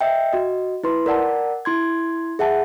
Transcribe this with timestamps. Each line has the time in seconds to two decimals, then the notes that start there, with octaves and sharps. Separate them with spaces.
0.01 D#5 E5 G5
0.33 F#4 D#5
0.84 E4 B4 C6
1.06 A#4 D5 F#5 A5
1.65 E4 C6 G#6
2.39 G#4 E5 F#5 A5